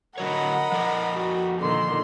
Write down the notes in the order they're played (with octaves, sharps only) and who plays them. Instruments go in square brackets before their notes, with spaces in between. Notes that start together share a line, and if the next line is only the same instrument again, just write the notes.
[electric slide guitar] D3 F#3 C#5 [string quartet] A#4 D#5 B5 [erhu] F#5
[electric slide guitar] F3 A4 D5
[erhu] F#4
[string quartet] A#2 D3 D#3 [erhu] C6